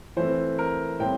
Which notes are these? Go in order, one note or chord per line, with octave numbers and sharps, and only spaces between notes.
E3 A3 C4 C5
A#4
A2 G3 C4 G5